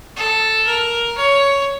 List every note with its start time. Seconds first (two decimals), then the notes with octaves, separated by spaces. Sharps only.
0.16 A4
0.66 A#4
1.18 C#5